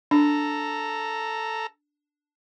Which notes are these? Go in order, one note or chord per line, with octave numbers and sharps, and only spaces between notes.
D4 A4 A#5